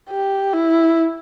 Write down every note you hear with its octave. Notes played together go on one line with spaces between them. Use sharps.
G4
E4